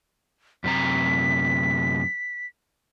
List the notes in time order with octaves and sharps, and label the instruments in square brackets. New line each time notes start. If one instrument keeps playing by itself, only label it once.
[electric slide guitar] F#2 C3 A#5 [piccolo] B6